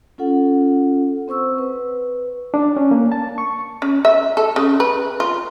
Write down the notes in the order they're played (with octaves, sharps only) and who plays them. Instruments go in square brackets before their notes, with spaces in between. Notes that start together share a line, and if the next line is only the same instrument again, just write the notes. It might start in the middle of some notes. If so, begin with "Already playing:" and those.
[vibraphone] C#4 F4 A4 F#5
C4 C5 C#6 E6
B4
[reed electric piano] D4
C#4
A#3
A5
C#6
[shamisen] C#4
E5
A4
C#3
B4
F4